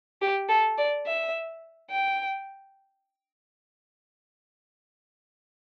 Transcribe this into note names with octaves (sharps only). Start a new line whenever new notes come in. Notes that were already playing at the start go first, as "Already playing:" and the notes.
G4
A4
D5
E5
G5